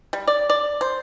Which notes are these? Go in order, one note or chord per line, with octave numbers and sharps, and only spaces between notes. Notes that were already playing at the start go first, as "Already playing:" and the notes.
G3
D5
D5
C5